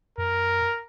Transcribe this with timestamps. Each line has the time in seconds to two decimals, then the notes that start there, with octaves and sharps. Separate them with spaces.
0.18 F#2 A#4